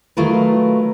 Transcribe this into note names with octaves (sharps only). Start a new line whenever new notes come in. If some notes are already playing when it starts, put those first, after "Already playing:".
D#3 F#3 A3 F4 A#4 B4